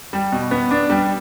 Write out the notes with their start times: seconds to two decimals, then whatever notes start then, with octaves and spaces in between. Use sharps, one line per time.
0.13 G3
0.32 B2
0.51 B3
0.71 D4
0.90 G3